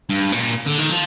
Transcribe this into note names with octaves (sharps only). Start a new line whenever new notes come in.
G2
A#2
D3
D#3
F3